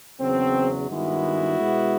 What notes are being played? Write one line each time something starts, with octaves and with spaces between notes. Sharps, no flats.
E2 C#3 F#3 C4
G2 D#3 G#3 B3 E4 F#4
B2 G#3 B3